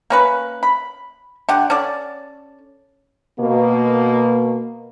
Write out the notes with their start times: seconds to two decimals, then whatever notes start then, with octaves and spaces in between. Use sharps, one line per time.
0.10 A#3 C#4 B4
0.63 B5
1.49 D3 G4 F#5
1.70 C#4 A4 D5
3.39 B2 A#3